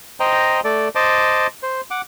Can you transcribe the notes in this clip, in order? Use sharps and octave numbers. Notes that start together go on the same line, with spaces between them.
C5 D#5 G5 A#5
A3 A4 D5
C5 D#5 A5 D6
C5
F#5 D6